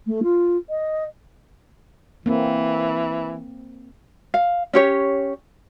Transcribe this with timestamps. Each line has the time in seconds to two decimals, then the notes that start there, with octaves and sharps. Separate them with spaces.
0.07 A3
0.23 F4
0.70 D#5
2.26 E3 A#3 C4
4.34 F5
4.73 C#4 G4 C#5